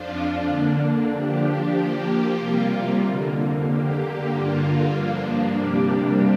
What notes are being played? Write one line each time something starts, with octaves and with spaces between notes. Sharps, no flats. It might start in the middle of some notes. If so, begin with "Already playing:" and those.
Already playing: F2 F3 D4 F4
D3 A#3 D4
F3 D4 G4
F3 A#3 G4
C3 G3 A#3 F4
F2 D3 A#3
D3 A#3 G4
G2 D3 A#3 F4
G2 F3 A#3 D4
C3 G3 A#3 D4 G4